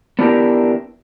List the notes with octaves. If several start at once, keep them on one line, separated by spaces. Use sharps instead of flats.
B3 D4 E4 G4 A#4